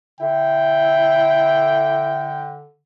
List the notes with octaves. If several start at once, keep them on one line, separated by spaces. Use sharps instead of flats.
D3 E4 G5